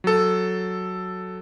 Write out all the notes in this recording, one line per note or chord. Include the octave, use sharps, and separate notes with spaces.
F#3 A4